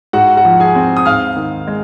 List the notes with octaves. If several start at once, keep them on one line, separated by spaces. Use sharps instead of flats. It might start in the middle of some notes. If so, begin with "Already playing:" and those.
G#2 F#4 F#5
F#4 F#5
F3
G#4 G#5
C4
D#6
G#2 F5 F6
D#3
G#3